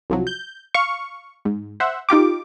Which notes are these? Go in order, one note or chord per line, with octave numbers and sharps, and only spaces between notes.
C2 F3 F#3
G6
F5 C#6
G#2
C5 E5 F#5
D#4 F4 G4 D6